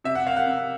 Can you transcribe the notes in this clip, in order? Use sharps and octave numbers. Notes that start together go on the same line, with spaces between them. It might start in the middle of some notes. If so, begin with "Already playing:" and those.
C3 E5
F#5
A#3 F5
F#5
C3